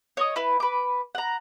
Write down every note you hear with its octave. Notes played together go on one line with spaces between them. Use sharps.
C#5 D#5 D#6
E4 B4
B4 D6
F#5 A#5